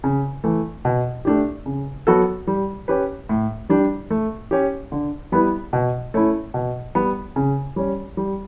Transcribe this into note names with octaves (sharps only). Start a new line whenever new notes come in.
C#3
E3 A3
B2
A3 D4 G4
C#3
F#3 B3 F#4 A4
G3
C#4 G4 B4
A2
G3 D4 G4
A3
C#4 G4
D3
G3 B3 E4 B4
B2
A3 C#4 E4
B2
G3 B3
C#3
G3 C#4
G3